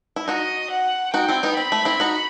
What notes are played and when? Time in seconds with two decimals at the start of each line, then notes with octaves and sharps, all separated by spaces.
0.16 E4
0.28 D#4 F#4 D#5
0.71 F#5
1.14 D#4 F#4 G5
1.28 C4 E4
1.43 B3 D#4
1.57 C4 B5
1.72 A3
1.85 C4 E4
2.00 D#4 F#4